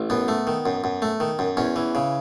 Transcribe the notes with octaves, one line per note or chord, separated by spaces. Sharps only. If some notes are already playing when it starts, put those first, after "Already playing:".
Already playing: A1
F#2 B3
A3
D#3
F#2
F#2
A3
D#3
F#2
E2 C#4
E3
C#3